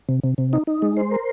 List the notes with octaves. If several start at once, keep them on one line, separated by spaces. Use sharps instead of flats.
C3
C3
C3
D#4
D#4
G#3
C5
A#4